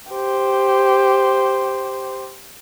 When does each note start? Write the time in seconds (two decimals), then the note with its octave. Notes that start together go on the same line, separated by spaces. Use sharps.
0.11 G4 C5